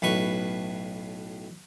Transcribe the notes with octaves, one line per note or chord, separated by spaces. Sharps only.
B1 A2 B4 C#6